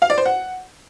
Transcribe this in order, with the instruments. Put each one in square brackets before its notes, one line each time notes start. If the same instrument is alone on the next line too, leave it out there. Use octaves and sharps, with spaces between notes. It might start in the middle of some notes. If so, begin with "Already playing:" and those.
[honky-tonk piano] F5
D5
C5
F#5